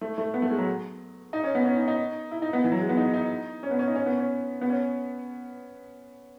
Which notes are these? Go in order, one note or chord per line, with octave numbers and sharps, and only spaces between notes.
A3
A3
B3
A3
G#3
F#3
D#4
C#4
B3
C#4
D#4
D#4
E4
D#4
B3
E3
F#3
G#3
B3
D#4
D#4
C#4
B3
C#4
D#4
C#4
B3
C#4
B3
C#4